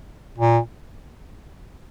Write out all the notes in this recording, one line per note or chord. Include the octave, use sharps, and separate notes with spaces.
A#2